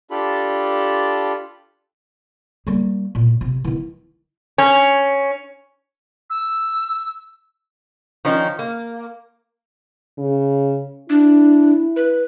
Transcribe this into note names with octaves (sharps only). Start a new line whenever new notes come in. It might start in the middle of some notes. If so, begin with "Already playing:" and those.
D4 F4 G4 A4 B5
G3 A#3
A#2
C3
D#3 E3
C#4
E6
D#3 F3 C#4 D#4
A#3
C#3
D4 E4
B4